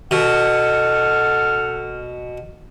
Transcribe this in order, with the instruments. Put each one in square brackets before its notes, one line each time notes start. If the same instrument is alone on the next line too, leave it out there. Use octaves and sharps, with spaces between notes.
[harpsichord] B2 [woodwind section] A4 F#5 F6